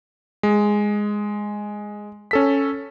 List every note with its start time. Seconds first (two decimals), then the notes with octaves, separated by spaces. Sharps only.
0.43 G#3
2.31 C#4 A4 B6